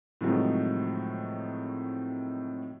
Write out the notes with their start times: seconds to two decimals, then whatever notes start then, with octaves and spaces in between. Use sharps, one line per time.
0.21 A2 C3 D#3 F3 F#3 G#3